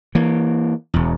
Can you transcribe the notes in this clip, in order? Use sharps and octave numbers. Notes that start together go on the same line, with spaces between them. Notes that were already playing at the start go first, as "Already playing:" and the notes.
E3 A#3
E1 E2